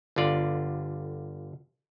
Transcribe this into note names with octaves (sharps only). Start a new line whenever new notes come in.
G1 D3 F4 D5